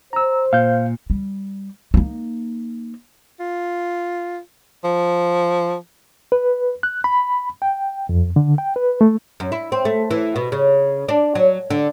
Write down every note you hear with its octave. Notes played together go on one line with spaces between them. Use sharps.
C5 A#5 E6
A#2 F5 G6
G3
A#3 D#4
F4
F3
B4
F#6
B5
G5
F2
D3
G5
B4
A3
F#2
E4
C4
A3
E3
B2
C#3
D4
F#3
D3